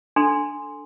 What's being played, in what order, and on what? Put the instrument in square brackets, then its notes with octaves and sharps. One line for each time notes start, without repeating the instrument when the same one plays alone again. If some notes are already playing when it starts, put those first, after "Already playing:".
[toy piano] D4 A4 G#5 C6